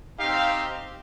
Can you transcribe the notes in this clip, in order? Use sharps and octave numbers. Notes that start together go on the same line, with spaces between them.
C4 D#4 G4 F5